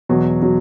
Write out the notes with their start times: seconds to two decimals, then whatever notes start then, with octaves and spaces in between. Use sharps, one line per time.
0.09 E2 B2 F#3
0.42 B2 F#3